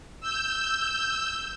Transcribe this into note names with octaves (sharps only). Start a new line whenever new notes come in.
E6 G6